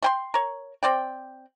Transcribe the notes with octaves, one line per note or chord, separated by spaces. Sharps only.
A3 G5 C6
A#4 C#5
C4 D5 G5